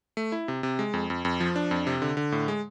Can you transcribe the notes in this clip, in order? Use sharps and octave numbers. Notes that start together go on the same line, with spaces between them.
A3
E4
C3
C3
G#3
F2
F2
F2
F3
D4
F2
C3
D3
D3
A2
G#3